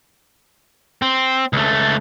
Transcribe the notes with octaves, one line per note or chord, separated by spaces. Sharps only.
C4
C#2 A3